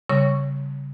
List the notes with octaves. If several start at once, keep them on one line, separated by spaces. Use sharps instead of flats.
C#3 G3 C#5 C#6